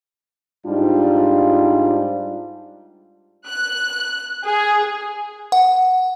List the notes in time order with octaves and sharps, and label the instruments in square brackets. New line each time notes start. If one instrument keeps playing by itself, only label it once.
[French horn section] G#2 G3 D4 D#4 F4
[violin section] F#6
G#4
[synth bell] F#5